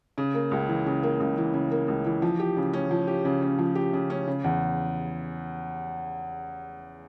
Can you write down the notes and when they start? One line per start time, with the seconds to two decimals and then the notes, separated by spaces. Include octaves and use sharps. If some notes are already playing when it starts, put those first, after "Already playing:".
0.18 C#3
0.34 A#3
0.51 C#2
0.69 E3
0.86 C#3
1.03 A#3
1.20 C#2
1.38 E3
1.54 C#3
1.71 A#3
1.88 C#2
2.06 E3
2.22 F3
2.40 G4
2.57 C#3
2.73 C#4
2.91 F3
3.07 G4
3.25 C#3
3.42 C#4
3.59 F3
3.75 G4
3.93 C#3
4.10 C#4
4.27 C#3
4.44 E2